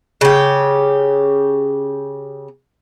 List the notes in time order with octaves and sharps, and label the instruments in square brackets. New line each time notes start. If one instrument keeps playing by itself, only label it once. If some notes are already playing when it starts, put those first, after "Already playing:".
[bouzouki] C#3 G4